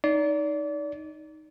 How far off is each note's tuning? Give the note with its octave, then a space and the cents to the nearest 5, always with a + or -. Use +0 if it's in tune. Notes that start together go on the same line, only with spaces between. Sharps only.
D#4 +0 D5 -30